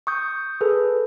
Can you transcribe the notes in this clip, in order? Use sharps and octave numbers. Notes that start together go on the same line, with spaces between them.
C#6 D#6 G6
G#4 A4 B4